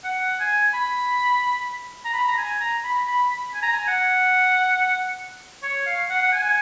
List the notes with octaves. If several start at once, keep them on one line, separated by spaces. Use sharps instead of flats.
F#5
G#5
B5
A#5
B5
A#5
G#5
A#5
B5
B5
B5
G#5
A#5
G#5
F#5
C#5
F5
F#5
F#5
G#5